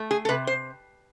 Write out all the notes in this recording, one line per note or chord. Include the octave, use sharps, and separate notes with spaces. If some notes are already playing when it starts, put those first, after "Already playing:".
Already playing: A3
G#4
A4
C3 B4
C5